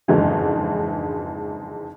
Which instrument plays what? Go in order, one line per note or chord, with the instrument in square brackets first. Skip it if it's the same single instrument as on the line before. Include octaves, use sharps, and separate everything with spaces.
[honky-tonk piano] F#1 F2 G#2 D3 E3 F#3